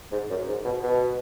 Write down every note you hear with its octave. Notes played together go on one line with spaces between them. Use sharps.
G#2
F#2
G#2
B2
B2